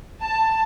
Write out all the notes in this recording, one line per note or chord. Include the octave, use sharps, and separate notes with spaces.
A5